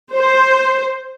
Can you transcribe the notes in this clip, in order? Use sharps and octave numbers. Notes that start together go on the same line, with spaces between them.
C5